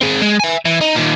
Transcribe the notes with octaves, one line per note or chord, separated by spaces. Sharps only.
C4 G#4
G#3
E5 G#5
E3
D#4
A#2 D#3